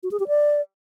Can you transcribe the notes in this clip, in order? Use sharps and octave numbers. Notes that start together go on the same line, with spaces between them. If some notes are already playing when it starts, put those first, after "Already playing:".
F#4
G#4
G4
D5